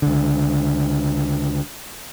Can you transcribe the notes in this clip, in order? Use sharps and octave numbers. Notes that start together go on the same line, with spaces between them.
C#2 D3